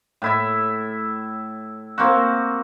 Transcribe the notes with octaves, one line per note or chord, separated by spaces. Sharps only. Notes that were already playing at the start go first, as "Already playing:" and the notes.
A2 E4 E5
A#3 C4 F#4